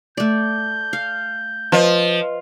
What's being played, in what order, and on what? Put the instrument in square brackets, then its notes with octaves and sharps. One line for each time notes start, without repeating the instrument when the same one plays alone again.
[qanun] A3 D5 [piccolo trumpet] G6
[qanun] F5
[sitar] F3 [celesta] B4 D#5